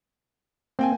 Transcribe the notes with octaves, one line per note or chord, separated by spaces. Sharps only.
A#3 C4 G5 G#5